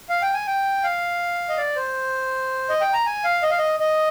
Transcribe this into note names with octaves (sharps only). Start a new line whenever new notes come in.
F5
G5
G#5
G5
F5
D#5
D5
C5
D#5
G5
A#5
G#5
F5
D#5
F5
D#5
D#5